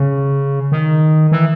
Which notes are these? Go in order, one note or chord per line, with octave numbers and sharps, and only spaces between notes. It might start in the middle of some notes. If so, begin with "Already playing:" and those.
Already playing: C#3
D#3
E3